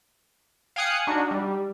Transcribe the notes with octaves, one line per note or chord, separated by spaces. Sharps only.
F5 G5 G#5 D#6 F#6 C#7
D4 D#4 F#4
G3